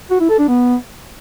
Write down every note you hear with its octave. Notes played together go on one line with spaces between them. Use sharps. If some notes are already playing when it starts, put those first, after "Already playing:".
F#4
E4
A4
D4
B3